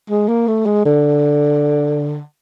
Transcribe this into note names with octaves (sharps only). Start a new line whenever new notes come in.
G#3
A#3
A3
G#3
D3